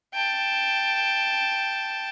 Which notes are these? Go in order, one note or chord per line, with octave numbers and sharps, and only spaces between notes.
G5 A5